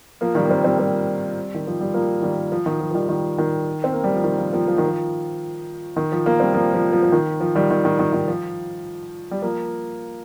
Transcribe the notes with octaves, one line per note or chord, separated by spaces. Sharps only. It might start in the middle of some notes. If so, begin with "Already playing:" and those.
F3 A#3
D#3 G3
A#3
G3 C4
G3 C4
G3 C4
D#3
F3
G3
F3 A#3
D#3 G3
F3
D#3
F3
F3
D#3 G3
D#3
D#3
C4
A#3
G3
F3
D#3
F3
F3 A#3
F3
D#3
F3
D#3
F3
F3 A#3
G3 C4
F3 A#3
F3
F3
F3
D#3
F3
D#3 G3
D#3
D#3
D#3
D#3
F3
G3
F3 A#3